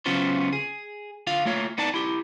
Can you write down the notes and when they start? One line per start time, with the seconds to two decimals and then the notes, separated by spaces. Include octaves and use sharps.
0.06 C#3 F#3 B3 C#4 F4 C5
0.52 G#4
1.27 D3 F4 F5
1.45 A3 A#3 F4 C#5
1.78 B3 D#4 D5 A5
1.94 E4 G4